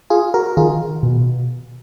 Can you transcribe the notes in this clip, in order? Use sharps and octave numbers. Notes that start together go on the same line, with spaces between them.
F4 G#4
F#4 A#4
D#3 F4 G#4
B2